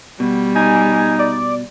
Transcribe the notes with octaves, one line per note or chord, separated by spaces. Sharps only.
B2 G3
D#4 G#5
D5